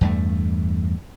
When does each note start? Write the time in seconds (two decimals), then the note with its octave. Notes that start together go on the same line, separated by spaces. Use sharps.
0.01 E2 G2 A3